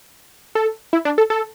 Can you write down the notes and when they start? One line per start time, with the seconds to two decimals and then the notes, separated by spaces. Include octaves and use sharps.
0.55 A4
0.93 E4
1.05 D4
1.18 A4
1.30 A4